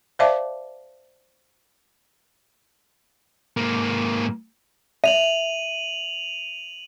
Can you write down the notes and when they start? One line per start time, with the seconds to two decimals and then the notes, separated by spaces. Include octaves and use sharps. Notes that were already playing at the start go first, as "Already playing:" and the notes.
0.19 C5 D5 E5 F5 A5 D6
3.57 G#2 A#3
5.04 E5 D#7 F7 F#7